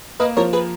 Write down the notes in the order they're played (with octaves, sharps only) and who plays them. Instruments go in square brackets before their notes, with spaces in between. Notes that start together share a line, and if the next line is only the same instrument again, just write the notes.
[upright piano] A#3 [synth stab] B4 D#5
[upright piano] F3 [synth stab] A#4 C#5
[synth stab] G#4 B4